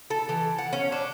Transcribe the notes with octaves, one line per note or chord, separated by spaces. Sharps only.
A4
E3
F#5
C#4
D4